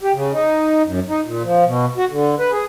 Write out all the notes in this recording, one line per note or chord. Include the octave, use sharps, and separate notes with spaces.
G4
C#3
D#4
F#2
D#4
A#2
F3
B2
F#4
D3
B4
G#4